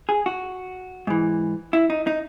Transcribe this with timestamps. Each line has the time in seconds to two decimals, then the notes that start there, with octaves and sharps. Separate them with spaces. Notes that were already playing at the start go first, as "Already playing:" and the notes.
0.09 G#4
0.26 F#4
1.07 G#2 E3
1.73 E4
1.90 D#4
2.07 D#4